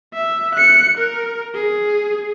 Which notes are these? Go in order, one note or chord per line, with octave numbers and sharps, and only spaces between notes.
E5
F#6 C#7
A#4
G#4